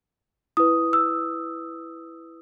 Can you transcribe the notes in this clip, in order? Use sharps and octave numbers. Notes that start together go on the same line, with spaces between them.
E4 B4 D#6
E6